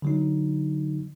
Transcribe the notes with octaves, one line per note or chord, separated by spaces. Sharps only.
D3 F#3 D#4